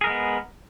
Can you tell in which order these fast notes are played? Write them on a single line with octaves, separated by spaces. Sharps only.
G#4 A#4 G#3 B3